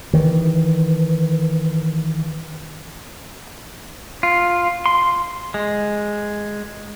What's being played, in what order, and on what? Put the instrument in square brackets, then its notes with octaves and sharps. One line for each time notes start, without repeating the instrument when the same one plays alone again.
[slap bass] D#3 E3
[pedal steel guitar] F4
C6
G#3